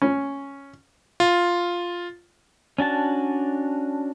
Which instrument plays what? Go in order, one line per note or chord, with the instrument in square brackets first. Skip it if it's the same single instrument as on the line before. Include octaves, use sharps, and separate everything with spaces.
[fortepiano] C#4
[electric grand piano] F4
[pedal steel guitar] C#4 D4 F#4 A5